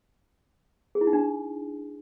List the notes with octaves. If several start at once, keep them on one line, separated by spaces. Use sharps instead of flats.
G#4
E4
D#4
D4